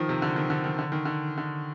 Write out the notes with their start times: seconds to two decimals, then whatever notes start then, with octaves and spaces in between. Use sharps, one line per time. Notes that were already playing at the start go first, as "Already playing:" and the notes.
Already playing: D#3 F3
0.09 C3
0.22 D3
0.36 D#3
0.50 D3
0.64 D#3
0.79 D3
0.92 D#3
1.05 D3
1.38 D3